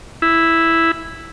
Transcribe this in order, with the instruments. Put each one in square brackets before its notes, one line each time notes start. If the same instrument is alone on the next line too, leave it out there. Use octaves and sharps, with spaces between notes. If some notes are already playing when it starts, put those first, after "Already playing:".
[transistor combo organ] E4